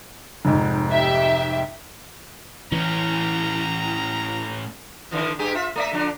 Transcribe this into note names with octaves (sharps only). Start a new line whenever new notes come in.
F1 G#2
G4 E5
A2 E3 C#4 E4 A#5
D3 D#3 F3
G2 G4 G#4
F4 E5
A3 D5 E5
D3 F3 D4